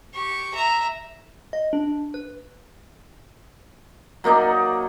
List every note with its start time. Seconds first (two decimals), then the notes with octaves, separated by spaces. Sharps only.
0.14 G4 C#6
0.55 E5 A#5
1.53 D#5
1.73 D4
2.14 B4
4.24 F#3 A#3 D#4 D5